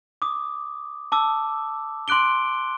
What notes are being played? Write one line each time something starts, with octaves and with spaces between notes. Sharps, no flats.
D6 D#6
A5 D6 E6
C6 D6 F#6 D7 G7